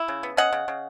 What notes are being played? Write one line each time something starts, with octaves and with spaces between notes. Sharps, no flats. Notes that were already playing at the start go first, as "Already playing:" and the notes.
Already playing: E4
C#3
B3
C#4 D#5 F#5
C#3
C#3